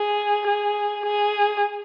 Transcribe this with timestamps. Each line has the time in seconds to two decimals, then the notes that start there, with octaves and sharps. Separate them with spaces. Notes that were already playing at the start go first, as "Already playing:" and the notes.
Already playing: G#4
0.47 G#4
1.06 G#4